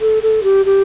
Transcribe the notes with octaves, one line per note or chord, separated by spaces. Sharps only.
A4
A4
G4
G4